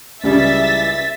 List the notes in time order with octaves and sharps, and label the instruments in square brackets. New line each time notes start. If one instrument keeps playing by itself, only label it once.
[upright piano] C#2 C#3 [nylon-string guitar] E3 G3 [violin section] E5 A6 B6